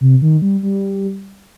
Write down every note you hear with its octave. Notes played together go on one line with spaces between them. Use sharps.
C3
D#3
G3
G3